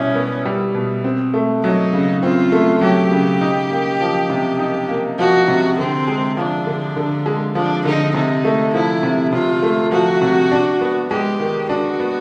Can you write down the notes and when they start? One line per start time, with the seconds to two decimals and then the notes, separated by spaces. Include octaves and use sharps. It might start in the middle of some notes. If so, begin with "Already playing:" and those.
Already playing: B2 G3 C#4 E4
0.15 B3
0.45 G3
0.75 B2
1.04 C4
1.34 A3
1.63 F#3 D#4
1.93 C#3
2.23 C4 F4
2.52 A3
2.81 F#3 G4
3.12 C#3
3.41 D#4
3.70 A#3
4.01 F3
4.30 C3
4.59 D#4
4.89 A#3
5.19 F3 F#4
5.48 C3
5.78 D3 C4
6.08 G#3
6.37 F3 D4
6.67 D3
6.96 D3
7.26 G#3
7.55 F3 D4
7.85 D3 D#4
8.15 C3 D#4
8.45 A3
8.74 F3 E4
9.03 C3
9.33 C3 F4
9.63 A3
9.92 F3 F#4
10.22 C3
10.52 D4
10.81 B3
11.11 G#3 G4
11.40 D#3
11.69 D4 F#4
12.00 B3